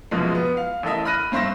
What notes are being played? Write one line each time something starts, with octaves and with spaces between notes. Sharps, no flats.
A#1 F#2 B2 F3 G#3
B3
F5
A1 A4 A#4 D#5 E5
B5 F6 F#6 A#6 D#7
G2 C4 C5 E5 C#6 A#6